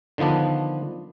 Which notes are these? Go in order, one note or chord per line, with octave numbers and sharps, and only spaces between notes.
D3 D#3 F3 B3 D4